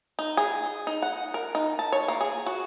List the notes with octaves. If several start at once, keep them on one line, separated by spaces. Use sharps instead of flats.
D#4
G#4
D#4
F#5
A#4
D#4
A5
C#5
A#3
G#4
F#4